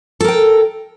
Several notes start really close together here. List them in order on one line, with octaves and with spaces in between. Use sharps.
A4 A#4 G5